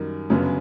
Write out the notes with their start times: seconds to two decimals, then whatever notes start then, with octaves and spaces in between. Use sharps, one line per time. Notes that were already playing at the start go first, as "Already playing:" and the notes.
Already playing: F#2 D#3 G3
0.30 G1 F#2 C#3 F#3 B3